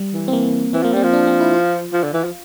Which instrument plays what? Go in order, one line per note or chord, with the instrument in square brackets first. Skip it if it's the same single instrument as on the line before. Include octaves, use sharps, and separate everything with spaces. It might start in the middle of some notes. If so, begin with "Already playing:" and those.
Already playing: [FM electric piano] G3
[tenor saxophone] E3
[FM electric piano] C4
A#3
[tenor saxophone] E3 [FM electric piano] C4
[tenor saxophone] F3 [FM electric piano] A#3
[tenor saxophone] G3 [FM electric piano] C4
[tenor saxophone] F3
[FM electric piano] D4
C4
E4
F4
[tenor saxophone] F3
D3
E3
F3